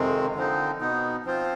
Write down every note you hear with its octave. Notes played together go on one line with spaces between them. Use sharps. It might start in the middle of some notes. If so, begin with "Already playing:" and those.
Already playing: F2 C3 D#3 G#3 C4
D3 F3 C4 D#4
B2 B3 D#4
F3 C4 F4 C5